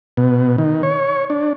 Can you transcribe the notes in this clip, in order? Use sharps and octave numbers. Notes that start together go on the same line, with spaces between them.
B2
D#3
C#5
D4